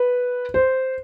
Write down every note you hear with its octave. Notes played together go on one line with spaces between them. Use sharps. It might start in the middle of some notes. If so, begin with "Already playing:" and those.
Already playing: B4
C5